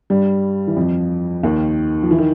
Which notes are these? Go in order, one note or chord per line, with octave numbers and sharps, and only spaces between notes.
G2 G3
E3
F2 F3
D#2 D#3
F3
E3
D#3